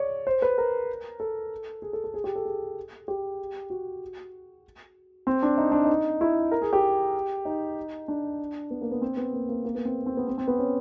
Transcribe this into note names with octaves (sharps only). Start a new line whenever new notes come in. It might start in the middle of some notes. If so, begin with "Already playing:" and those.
Already playing: C#5 D5
C5
B4
A#4
A4
G#4
A4
A4
G#4
G4
A4
G#4
G4
F#4
C4
D4
D#4
D4
D#4
E4
A#4
G#4
G4
D#4
D4
B3
A#3
B3
C4
B3
A#3
A#3
A#3
B3
C4
C4
B3
C4
C4
B3
C#4